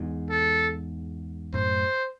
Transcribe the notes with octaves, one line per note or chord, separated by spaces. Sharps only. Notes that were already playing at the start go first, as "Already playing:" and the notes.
Already playing: E2 G#2
A4
F#2 A2 C5